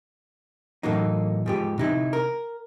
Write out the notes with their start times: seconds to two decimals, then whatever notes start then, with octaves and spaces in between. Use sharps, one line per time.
0.83 A2 E3 F#3 A#3 D#4
1.46 G#2 F3 G4
1.78 C3 D#4 E4
2.13 A#4